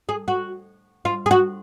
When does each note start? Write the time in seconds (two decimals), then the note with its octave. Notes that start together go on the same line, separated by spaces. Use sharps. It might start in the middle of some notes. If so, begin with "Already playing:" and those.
0.09 G#4
0.28 F#4
1.05 F4
1.26 G#4
1.31 F#4